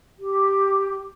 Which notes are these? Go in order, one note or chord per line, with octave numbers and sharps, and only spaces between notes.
G4